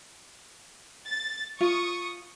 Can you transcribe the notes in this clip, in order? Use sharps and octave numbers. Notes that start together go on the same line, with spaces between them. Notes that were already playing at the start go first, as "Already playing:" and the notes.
A6
F4 C#6 D#6